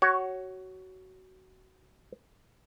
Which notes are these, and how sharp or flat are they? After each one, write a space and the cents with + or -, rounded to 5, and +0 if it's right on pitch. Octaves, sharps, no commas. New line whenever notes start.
F#4 +20 C#5 +0